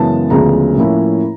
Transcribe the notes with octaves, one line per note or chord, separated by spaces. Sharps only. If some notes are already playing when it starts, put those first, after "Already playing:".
Already playing: F#2 C#3 E3 G#3 B3 A5
D2 C#3 F3 G#3 B3 A#5
A2 F3 A#3 C#4 E4